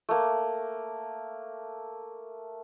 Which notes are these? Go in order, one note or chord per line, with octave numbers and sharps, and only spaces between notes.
A3 A#3